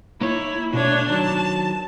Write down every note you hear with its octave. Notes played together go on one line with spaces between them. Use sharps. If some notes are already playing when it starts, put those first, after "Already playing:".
A#3 D#4 E4 C#5
B2 A3 D4 C#5
D#3 F#3 A5